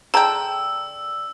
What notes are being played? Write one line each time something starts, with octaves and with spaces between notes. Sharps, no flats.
D3 G#4 D5 G5 A5 A#5 E6